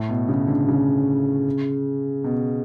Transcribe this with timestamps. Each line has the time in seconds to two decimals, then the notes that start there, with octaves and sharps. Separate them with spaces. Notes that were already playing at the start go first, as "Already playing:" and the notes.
Already playing: A2
0.09 B2
0.29 C#3
0.48 D3
0.68 C#3
2.24 B2